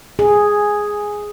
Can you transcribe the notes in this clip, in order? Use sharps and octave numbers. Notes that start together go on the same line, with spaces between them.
G#4